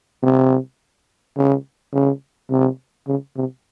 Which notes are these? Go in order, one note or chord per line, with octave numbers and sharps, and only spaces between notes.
C3
C#3
C#3
C3
C#3
C3